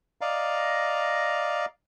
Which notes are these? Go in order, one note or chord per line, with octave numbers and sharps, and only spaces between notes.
D5 D#5 F5 A#5